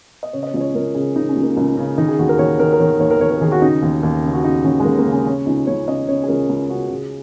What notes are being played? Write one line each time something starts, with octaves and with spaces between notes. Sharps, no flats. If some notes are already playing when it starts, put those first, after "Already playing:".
D#5
C#3 C#5
D#5
C#5
C#2 D#5
C#5
C#2 A#4
C#3 G#4
C#3 D#4
C#4
C#2
A#3
C#2 A#3
C#3
D#3 D#4
G#4
D#2 F#4
A#4
D#2 C#5
D#3 A#4
A#4
D#3 C#5
D#2 C#5
A#4
D#2 C#5
A#4
D#3 G#4
F#4
C#3 D#4
D#2
D#2
C#3
F#4
C#3 D#4
D#2 C#4
G#3
D#2 A#3
A#3
C#3
C#4
C#3 C#4
C#2 D#4
C#2 C#5
C#3 D#5
C#3 C#5
G#4
C#2 A#4
C#2 G#4
C#3 F#4
C#3 G#4